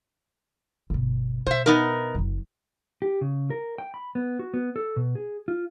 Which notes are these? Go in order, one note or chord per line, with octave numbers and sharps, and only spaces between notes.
G1 B2
B2 C5 E5
B3 D#4 A#4
F#1 F#2
G4
C#3
A#4
G5
B5
B3
F#4
B3
A4
B2
G#4
F4